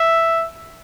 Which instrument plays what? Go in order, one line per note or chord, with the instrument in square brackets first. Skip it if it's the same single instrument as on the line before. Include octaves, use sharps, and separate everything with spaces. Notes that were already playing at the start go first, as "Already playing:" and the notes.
Already playing: [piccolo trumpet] E5